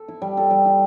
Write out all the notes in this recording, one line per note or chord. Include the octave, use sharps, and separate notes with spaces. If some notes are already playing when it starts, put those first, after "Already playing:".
Already playing: A4
E4
G3
A4
G3
E4